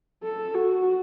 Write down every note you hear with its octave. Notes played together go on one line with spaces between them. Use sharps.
A4
F#4